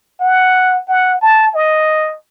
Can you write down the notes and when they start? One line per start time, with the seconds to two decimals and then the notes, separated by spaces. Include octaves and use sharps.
0.21 F#5
0.88 F#5
1.22 A5
1.55 D#5